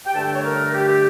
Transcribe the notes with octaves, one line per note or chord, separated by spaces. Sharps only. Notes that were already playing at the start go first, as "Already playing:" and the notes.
G5
G2 D3 A3 A5
G5
C#5
A#4
G4